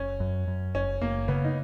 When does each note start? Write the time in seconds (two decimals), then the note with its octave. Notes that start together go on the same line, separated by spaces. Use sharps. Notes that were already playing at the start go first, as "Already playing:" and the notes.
Already playing: F#1 C#4
0.20 F#2
0.48 F#2
0.74 F#1 C#4
1.02 F#1 A#3
1.28 C#3 B3
1.44 D#4